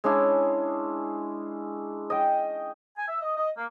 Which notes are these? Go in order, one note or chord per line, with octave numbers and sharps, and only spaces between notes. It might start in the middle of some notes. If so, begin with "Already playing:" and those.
G#3 C#4 D4 E4
D#5 G5
G#5
E5
D#5
D#5
A#3